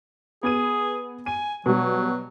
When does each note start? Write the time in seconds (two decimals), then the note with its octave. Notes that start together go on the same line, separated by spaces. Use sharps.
0.43 B3 G#4 G#6 D#7
1.26 G#5 D#7
1.66 B2 F#3 G3